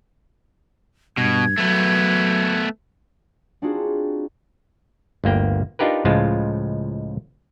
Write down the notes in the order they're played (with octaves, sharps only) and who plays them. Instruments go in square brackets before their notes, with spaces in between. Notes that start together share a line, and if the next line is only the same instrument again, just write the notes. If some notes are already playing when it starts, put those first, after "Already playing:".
[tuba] G2 [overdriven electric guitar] B2 [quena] G#6
[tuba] F#3 [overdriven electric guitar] A3 B3
[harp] C4 D4 D#4 F4 F#4 G#4
[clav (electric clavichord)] G1 D2 A#3 G5
D4 D#4 F4 G4 A#4 B4
C#2 A2 F3 G#3 F4 A5